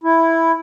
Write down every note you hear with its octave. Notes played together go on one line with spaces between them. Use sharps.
E4